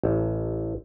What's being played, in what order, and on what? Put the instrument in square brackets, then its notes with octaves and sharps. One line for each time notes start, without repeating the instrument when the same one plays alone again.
[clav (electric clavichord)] A1